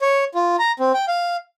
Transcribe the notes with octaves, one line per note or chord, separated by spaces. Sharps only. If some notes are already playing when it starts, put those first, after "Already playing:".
C#5
F4
A#5
C4
G5
F5